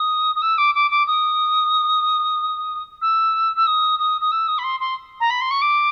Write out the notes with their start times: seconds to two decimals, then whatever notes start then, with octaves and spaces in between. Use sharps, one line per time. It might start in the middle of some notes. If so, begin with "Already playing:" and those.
Already playing: D#6
0.35 D#6
0.42 E6
0.58 D6
0.75 D6
0.91 D6
1.07 D#6
3.01 E6
3.56 E6
3.67 D#6
3.99 D#6
4.21 D#6
4.32 E6
4.48 D#6
4.58 B5
4.63 C6
4.80 C6
5.20 A#5
5.30 B5
5.41 C6
5.51 C#6
5.62 D6